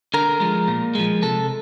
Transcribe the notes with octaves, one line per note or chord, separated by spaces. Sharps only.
D3 A#4
F3 G#3
A#2
F3 G#3
C3 A4